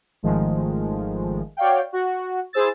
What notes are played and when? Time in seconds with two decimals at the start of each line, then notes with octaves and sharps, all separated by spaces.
0.23 G#1 D#3 F3 G#3 A3
1.57 F#4 C#5 D5 F5 G5
1.92 F#4
2.53 E4 G#4 C5 E6 A6